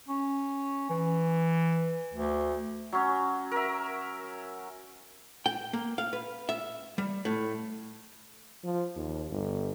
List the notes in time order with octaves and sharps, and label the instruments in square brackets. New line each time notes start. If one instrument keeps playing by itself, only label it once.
[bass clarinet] C#4
E3
D2
[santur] F#3 C#4
A#4 E5
[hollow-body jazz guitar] G5
A#3
F5
B4
E5
G3
A2
[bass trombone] F3
D#2
G1